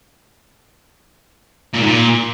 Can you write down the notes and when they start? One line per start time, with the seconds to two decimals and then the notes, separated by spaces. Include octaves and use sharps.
1.73 A#2
1.79 G#2
1.85 A#2